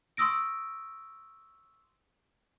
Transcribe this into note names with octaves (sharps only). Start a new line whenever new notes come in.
C6 C#6 D#6 E6 A#6 D7